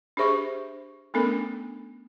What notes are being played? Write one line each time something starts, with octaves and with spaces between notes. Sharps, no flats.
D4 G4 G#4 C5 E5 C#6
A3 B3 C#4 D4 A4 A#4